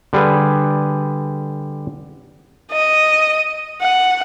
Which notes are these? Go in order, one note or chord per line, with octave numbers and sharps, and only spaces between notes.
D3 G3 G#4 B4
D#5
F#5